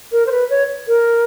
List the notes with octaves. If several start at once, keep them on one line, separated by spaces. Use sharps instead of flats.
A#4
C5
B4
C#5
A#4